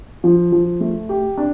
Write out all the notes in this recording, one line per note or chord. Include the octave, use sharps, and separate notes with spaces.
F3
F3
A3
G4
D4